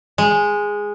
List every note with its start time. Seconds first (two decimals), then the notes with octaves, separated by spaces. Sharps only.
0.18 G#3